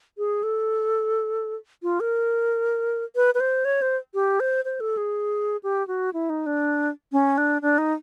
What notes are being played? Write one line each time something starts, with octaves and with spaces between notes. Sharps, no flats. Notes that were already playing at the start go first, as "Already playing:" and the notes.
G#4
A4
F4
A#4
B4
B4
C5
C#5
C5
G4
C5
C5
A4
G#4
G4
F#4
E4
D#4
D4
C#4
D4
D4
D#4